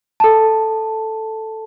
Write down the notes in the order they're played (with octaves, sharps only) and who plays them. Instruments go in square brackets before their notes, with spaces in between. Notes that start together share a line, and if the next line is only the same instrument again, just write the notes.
[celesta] A4 A5